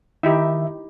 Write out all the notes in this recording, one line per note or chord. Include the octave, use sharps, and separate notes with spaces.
D#3 D#4 E4 G4 E5